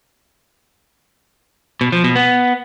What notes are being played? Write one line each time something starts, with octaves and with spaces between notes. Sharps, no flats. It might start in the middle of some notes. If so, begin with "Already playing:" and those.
B2
F3
B2
B3